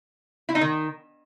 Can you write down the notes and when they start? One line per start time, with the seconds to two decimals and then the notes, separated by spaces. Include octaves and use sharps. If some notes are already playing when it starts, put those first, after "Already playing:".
0.49 E4
0.55 D#4
0.61 D#3